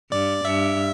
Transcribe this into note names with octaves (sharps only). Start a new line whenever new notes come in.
G2 D5
G2 E5